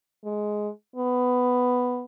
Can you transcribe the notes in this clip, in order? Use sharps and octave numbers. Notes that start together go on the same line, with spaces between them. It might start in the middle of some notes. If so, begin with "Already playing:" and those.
G#3
B3